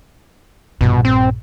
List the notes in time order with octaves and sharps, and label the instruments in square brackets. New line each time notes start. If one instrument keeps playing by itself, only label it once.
[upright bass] A#1 G2 [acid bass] B2
[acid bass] C4